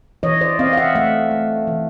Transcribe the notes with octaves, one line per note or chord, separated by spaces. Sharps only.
E3 C#5 D#5
C5 D5
C4 D#5 F5
F5
E5 F#5
A3 E5 F#5
A3
E3